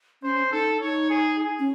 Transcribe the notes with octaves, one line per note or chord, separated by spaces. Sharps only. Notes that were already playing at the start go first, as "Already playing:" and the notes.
C#4 C5
D#4 A4
D#4 C#5
G#4
G#4
C#4